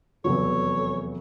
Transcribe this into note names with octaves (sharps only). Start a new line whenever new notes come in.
F1 E2 F#3 A4 C#5